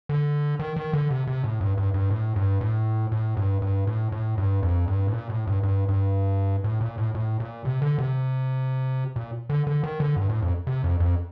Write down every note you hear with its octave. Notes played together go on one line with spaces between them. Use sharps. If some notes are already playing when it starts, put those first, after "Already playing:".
D3
D#3
D#3
D3
C3
C3
A2
G2
G2
G2
A2
G2
A2
A2
G2
G2
A2
A2
G2
F2
G2
A2
A#2
A2
G2
G2
G2
A2
A#2
A2
A2
A#2
C3
D3
C3
A#2
D3
D3
D#3
D3
G2
A2
F2
C3
F2
F2